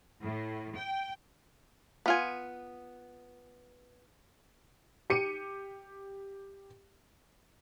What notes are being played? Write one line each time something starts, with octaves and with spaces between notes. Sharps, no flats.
A2
G5
B3 F4 G#5
G4 C#7 D#7